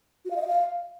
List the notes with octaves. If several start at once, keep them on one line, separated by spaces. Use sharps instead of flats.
F#4
F5
D#5
E5
F5